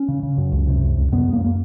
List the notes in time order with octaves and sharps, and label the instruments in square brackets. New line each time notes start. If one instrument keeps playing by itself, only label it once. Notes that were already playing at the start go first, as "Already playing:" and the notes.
Already playing: [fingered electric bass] C#4
C#3
C#3
F#2
C#2
C3
C#2
C#2
F#2 B3
F#2
A#3
A#3